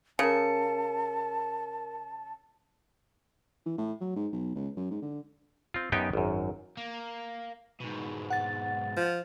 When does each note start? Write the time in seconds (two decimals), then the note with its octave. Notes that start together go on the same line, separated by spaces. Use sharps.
0.19 C#3 A#4 A5 C#7
3.66 E3
3.78 A2
4.00 F#3
4.16 G#2
4.32 B1
4.55 C#2
4.77 F#2
4.91 G#2
5.02 D3
5.74 C4 F4
5.92 F#2 B3 D#4 G4 G5 G#5
6.13 G#1 F#2
6.77 A#3
7.80 G#2 B2
8.30 F#5 A6
8.97 F3